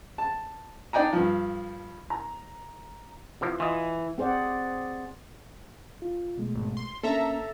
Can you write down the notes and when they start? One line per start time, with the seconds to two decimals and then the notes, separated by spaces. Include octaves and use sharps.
0.18 A5
0.93 D4 D#4 D5 G5 G#5 A#5
1.13 G2 F3
2.10 A#5
3.41 C3 E3 F3
3.60 E3 F4 D#5
4.18 C4 G#4 C5 D5 F#5
6.02 F4
6.37 B2 G#3 A3
6.55 G#1
6.77 C6
7.03 A#3 C#4 D4 A4 E5 A#5